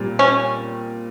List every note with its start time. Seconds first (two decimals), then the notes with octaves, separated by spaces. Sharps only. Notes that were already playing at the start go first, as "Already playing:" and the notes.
Already playing: A#2 G3 C4
0.19 C#4